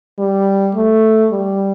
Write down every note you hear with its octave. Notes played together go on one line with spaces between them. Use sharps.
G3
A3
G3